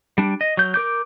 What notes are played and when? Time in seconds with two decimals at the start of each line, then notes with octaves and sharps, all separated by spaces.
0.18 G3 D4
0.41 D#5
0.57 F#3 G6
0.74 A#4 D6 G6